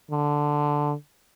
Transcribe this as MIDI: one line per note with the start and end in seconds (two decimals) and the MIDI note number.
0.10 0.94 50